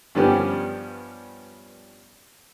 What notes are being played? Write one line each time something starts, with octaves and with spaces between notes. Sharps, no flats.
G2 F3 G3 B3 C#4 G4